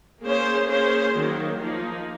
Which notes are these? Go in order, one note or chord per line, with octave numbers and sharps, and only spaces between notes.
A#3 C#4 G#4 C5
A#3 C#4 G#4 C5
D#3 F#3 A#3
F3 A#3 D#4